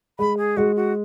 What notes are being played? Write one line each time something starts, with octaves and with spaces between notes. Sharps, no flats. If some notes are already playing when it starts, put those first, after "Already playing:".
G#3 B5
G#4
G#3 F#4
F#4